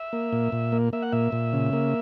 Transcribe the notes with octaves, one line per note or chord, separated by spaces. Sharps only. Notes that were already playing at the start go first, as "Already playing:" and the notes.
Already playing: E5
A#3
A#2
A#2
A#3
A#3 E5
F#5
A#2 E5
A#2
C#3
A#3